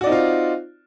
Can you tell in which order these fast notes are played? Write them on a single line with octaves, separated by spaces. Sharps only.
F#4 D5 D#4 C4 F4